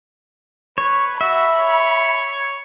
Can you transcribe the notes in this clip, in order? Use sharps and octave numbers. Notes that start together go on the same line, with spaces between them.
B4 C#5
F#4 E5 B5
C#5